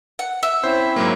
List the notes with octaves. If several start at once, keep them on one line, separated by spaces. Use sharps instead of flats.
F#5
E5
C4 C#4 E4 C5
G#2 F#3 A#3